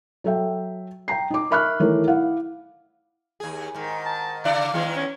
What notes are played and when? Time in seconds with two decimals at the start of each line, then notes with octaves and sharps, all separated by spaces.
0.24 F#3 A4 E5 G5
1.08 G5 A#5 C7
1.30 D#4 D6
1.50 A#4 E5 B5 C#6 F6 F#6
1.80 D#3 E3 A3 A#4 C#5
2.07 E4 F5 F#5
3.40 D#2 G#4
3.74 G#2 D#3
4.06 A5
4.45 C#3 D4 D5 F5
4.74 D#3 G#3 B3
4.96 C#4